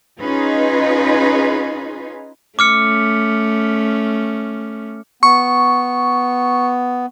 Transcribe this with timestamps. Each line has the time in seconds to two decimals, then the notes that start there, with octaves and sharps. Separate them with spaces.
0.20 C#4 D#4 F4 G#4 B4 D#5
2.59 A3 C#4 D6 F6 C#7
5.23 B3 C#6